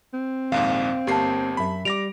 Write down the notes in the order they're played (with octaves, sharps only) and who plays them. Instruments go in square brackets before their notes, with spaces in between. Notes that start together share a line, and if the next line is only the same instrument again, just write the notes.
[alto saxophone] C4
[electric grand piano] A#1 D#2 G#2 [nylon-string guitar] F5
[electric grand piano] G1 A#3 C7 [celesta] G4 A5
[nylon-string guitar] F#2 E5 [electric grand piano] B5
[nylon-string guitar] G3 [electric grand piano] D6 A#6 D7 [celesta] F7